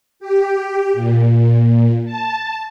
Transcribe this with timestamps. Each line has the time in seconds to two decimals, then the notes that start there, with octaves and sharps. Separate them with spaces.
0.20 G4
0.93 A#2
2.05 A5